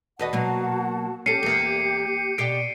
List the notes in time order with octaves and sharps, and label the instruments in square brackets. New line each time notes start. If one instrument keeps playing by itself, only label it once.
[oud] D#2 B4 D#5 [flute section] F#4 F#5 A5
[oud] B2 F#3 A#3
[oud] C#4 A4 [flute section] G4 [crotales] C7 C#7 D#7
[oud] E2 A#3
[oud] B2 G4 [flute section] D5 [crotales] C7 D7